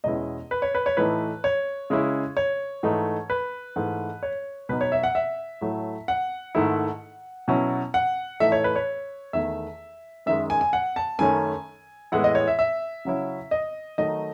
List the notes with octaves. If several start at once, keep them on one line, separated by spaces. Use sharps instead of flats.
E2 B2 G#3 C#4 E4 D#5
B4
C#5
B4
C#5
A2 E3 A3 D#4 B4
C#5
C#3 G#3 C#4 E4
C#5
G#2 E3 A3 D#4
B4
G#2 E3 A3
C#5
B2 F#3 B3 D#4 B4
C#5
E5
F#5
E5
A2 F#3 A3 E4
F#5
G#2 D#3 A3 E4
B2 F#3 C#4 E4
F#5
A2 E3 A3 D#4 E5
C#5
B4
C#5
E2 D#3 A3 E5
F#2 D#3 G#3 E5
G#5
G#5
F#5
A5
F#2 D#3 A3 C#4 G#5
A2 E3 G#3 B3 E4 F#5
D#5
C#5
E5
E5
C#3 F#3 C#4 E4
D#5
D#3 F#3 A3 D#4 D#5